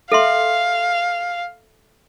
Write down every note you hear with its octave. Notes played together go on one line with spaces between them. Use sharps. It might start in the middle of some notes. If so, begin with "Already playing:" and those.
A4 E5 F5 C6